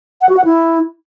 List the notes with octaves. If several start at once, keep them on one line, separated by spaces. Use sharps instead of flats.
F#5
F#4
F#5
E4